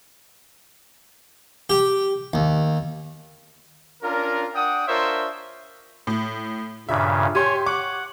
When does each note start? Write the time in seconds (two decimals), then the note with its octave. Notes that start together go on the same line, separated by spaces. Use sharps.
1.70 G4
2.34 D#2
4.03 C#4 D4 F4 A#4
4.55 D4 F#5 G5 D#6
4.87 D4 F4 A#4 C5 C#5 E5
6.07 A2
6.89 G2 A#2 C#3 E5
7.35 G4 C#5 G#5 C6 G6
7.66 F#5 C#6 D6